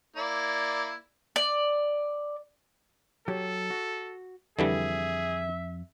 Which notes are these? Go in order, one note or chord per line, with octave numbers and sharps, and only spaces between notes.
A#3 E4 D5
D5
F#3 G4 A4
F#4
F2 D3 E3 G3 G#4 E5